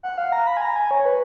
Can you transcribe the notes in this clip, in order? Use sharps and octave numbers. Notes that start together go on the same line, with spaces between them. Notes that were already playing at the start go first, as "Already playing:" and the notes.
F#5
F5
A#5
B5
G#5
A#5
G#5
C#5
B4